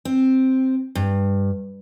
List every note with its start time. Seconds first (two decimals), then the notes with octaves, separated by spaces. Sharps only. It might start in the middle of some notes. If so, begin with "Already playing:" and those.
0.05 C4
0.95 G2